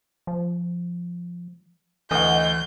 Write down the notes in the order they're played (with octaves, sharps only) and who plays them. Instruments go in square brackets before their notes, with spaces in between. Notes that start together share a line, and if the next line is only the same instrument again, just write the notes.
[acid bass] F3
[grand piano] D2 [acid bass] E3 [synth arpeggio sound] D#5 F#5 [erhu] G6